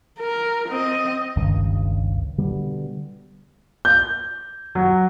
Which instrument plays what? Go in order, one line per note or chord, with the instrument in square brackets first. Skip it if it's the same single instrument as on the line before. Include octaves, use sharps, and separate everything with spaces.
[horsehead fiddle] A#4
C4 D#5
[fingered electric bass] G1 C#2 G2 D#3
B2 D3 G3 B3
[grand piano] G6
F#3